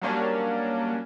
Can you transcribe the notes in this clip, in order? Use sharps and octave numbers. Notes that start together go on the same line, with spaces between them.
F#3 G3 A#3 C#4 D4